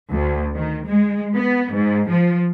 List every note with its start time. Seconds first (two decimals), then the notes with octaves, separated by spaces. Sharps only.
0.12 D2
0.56 D#3
0.87 G#3
1.35 B3
1.73 G#2
2.11 F3